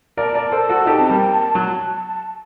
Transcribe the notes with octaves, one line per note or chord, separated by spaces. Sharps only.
A#4 D5 A5
A#4 D5
A4 C5
F#4 A4
D#4 G4
C4
G3 A#3
F#3